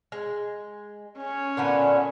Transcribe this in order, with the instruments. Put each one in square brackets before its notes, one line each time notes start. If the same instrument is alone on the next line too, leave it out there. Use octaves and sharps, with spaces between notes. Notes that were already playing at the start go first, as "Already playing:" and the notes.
[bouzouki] G#3
[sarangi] C#4
[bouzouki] A#2 D3 B3